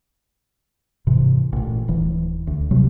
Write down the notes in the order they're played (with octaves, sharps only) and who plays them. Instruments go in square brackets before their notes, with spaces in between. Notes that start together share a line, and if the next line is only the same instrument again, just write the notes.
[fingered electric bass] G#2 C3 E3
A1 A#2
D1 E3
D2
C3 F#3 G3